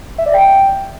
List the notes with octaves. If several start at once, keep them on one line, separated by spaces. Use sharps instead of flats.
E5
D5
G5